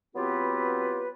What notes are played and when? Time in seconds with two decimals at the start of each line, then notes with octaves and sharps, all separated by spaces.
0.15 F#3 B3 C4 F4 G4 B4